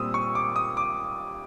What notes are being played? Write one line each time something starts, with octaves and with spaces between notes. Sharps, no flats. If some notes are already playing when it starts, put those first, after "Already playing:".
Already playing: A#2 G3 C4 D#6 E6
C#6
D6
D#6
D6